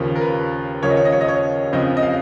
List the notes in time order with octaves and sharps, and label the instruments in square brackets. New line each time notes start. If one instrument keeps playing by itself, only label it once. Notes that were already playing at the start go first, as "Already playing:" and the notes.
Already playing: [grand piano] D#2 C#3 F3
A#4
B4
D#2 C#3 F3 C#5
D#5
C#5
D#5
C#5
D#5
C#5
F2 C#3 F3 D#5
D#5
F5